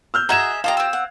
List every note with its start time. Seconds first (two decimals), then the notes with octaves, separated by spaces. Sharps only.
0.14 E6 F6 G6
0.29 F#4 G#4 D#5 E5 A#5 G#6 E7
0.64 F4 G4 A4 D#5 F5 A#5
0.77 C4 E6
0.93 F#5